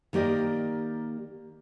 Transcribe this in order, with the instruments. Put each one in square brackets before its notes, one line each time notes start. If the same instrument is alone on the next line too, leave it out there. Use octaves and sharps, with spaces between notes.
[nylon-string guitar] D#3 A#3 G4 D5 D#5